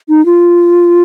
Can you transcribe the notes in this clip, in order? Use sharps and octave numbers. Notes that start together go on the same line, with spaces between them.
D#4
F4